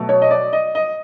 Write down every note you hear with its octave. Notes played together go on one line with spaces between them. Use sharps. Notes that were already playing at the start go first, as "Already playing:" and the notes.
Already playing: B2 F#3 A3
C#5
D#5
D5
D#5
D#5